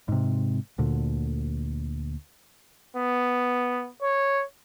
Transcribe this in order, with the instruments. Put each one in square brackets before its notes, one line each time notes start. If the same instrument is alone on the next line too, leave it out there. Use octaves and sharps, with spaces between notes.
[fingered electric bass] G#2 C3
D2 A#2 D3
[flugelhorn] B3
C#5